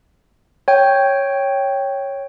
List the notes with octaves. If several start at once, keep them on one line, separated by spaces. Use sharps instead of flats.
C#5 G5